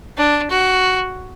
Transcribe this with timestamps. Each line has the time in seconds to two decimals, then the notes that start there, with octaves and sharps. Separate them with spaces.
0.17 D4
0.51 F#4